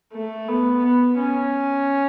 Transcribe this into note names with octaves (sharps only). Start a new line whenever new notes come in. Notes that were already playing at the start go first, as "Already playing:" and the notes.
A3
B3
B3
C#4